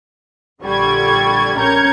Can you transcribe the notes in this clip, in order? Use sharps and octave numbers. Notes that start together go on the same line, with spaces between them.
A#1 D3 G3 C#6 G#6
C#4 A#4 A#5 G6 G#6 C#7